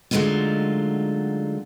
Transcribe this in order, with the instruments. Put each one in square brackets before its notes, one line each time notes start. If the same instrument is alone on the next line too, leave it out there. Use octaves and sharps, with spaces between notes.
[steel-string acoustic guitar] D3 F#3 G#3 A3 D#4 F4